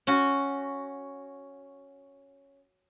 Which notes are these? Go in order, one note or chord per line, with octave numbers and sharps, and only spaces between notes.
C#4 F#4